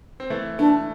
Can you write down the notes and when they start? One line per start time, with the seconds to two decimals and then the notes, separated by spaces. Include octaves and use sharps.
0.20 C4
0.30 E3 A3
0.59 E3 A3 D4